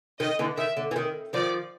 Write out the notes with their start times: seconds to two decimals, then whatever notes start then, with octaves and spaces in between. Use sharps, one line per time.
0.20 D#3 D#5
0.39 D3 E3
0.57 D#3 E5
0.77 D3
0.91 E3
0.96 D#3
1.33 D#3 F3 D5